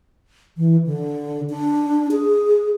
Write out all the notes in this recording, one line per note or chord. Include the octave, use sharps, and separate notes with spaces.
E3
D3
D4
G#4